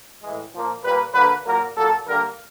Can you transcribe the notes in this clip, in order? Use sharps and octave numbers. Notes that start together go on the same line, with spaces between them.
A2 E3 G#3
A#2 F3 A#3
A#2 G3 A#3 B4
D3 F#3 A#3 B4
A#2 F#3 A#3 A#4
A#2 F#3 A#3 A4
D3 G3 A#3 A#4